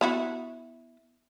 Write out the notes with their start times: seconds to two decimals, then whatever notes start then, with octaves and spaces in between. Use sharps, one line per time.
0.01 B3 E4 F#4